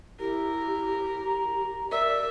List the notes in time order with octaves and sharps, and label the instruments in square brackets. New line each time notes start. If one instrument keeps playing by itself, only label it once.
[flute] E4 [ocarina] G4 [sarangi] A#4
[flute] A#5
[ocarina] A#4 [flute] D5 [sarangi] E5